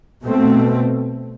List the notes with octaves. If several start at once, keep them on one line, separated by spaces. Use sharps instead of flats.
B2 A3 C4